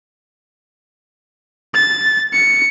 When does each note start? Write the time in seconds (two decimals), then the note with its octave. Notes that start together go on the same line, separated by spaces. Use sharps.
1.74 A6
2.33 C#7